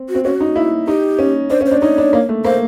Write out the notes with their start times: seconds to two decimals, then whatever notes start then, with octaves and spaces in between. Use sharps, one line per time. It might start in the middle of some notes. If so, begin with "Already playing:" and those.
Already playing: C4
0.09 F#4
0.15 C4
0.24 C#4 F#4
0.41 D#4
0.56 E4
0.88 D#4 G4
1.19 C#4
1.50 D4 C5
1.61 C#4
1.66 C5
1.71 D4
1.81 D#4 C#5
1.98 D4
2.13 A#3
2.29 A3
2.45 A#3 C5